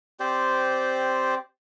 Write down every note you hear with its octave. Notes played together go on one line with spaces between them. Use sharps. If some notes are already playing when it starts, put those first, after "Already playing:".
C4 G4 C5 D5